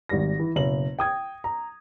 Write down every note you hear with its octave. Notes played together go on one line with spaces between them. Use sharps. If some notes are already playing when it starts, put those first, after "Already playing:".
G#1 G3 A#6
E3
F#1 B2 F#7
G5 D#6 G#6
A#5